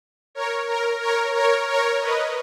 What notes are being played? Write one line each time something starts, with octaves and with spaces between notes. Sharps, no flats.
A#4 C#5
A#4
A#4 C#5
A#4 C#5
A#4 C#5
B4 D#5